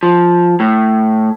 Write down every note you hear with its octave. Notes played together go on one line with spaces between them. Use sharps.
F3
A2